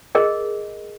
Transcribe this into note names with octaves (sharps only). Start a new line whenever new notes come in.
G#4 A#4 D#5